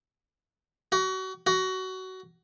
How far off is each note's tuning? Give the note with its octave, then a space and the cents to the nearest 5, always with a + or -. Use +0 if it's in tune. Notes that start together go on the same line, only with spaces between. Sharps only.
F#4 +30
F#4 +20